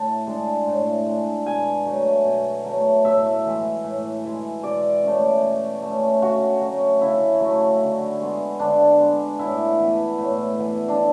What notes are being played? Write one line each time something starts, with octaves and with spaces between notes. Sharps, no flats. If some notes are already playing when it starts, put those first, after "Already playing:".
Already playing: A2 A5
G#3 D4
A2
G#3 D4
B2 G#5
F#3 A3
B2
F#3 A3
A2 E5
E3 G#3
A2
E3 G#3
B2 D5
A3 C#4
B2
A3
C#4
C#3 F#4
F#3 A3
C#3 E4
F#3 A3
D3
G#3 B3
D3 D4
G#3 B3
A2 E4
E3 B3
A2
E3 B3
D4